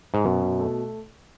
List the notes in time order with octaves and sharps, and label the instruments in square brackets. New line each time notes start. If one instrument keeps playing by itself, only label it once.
[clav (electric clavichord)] G#2
[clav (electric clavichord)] F#2 [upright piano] B2
[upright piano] B2
A3